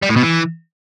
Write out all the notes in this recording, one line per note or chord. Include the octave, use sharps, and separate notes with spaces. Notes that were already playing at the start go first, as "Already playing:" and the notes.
G3
A2
B2
E3